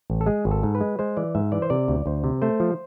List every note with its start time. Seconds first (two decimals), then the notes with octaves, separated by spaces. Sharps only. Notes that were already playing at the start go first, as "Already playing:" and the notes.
0.10 A1
0.21 A4
0.26 G#3 G#4
0.45 G#1
0.51 A4
0.63 G#2
0.75 B4
0.81 G#3
0.99 G#3 C5
1.17 E3 D5
1.35 G#2 E5
1.52 E3 D5
1.62 C5
1.70 C3 D5
1.88 D2
2.06 D2 C5
2.24 C3
2.42 A3 C5
2.60 F3